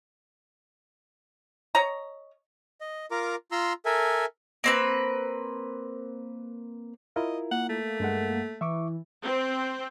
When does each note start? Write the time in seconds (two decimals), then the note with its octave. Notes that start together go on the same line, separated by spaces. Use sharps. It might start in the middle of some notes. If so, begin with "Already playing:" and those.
1.75 C#5 D#5 A#5
2.81 D#5
3.11 F4 A#4 A#5 D6
3.52 F4 A#5 C6 E6
3.86 A4 A#4 E5 G#5
4.64 A#3 C4 B4
7.16 E4 F4 A#4 D#5
7.51 A#3 F#5
7.69 A3
8.00 G2 G#3 F#5
8.61 E3 E5 C#6 D6
9.23 C4